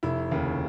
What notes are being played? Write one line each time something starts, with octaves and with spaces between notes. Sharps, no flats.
F1 E4
D#2 C#3